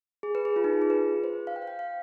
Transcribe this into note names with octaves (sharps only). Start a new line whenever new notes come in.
G#4
B4
G#4
F4
D#4
F4
G#4
B4
C5
F5
G5
F5
G5
F5